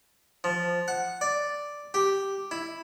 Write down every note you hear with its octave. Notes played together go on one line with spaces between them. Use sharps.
F3
F#5
D5
G4
E4